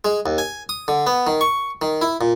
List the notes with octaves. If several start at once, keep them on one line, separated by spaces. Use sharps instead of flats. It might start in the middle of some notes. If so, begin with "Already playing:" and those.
G#3
D#2
G#5
D#6
D3
B3
D#3
C#6
D#3
E4
A#2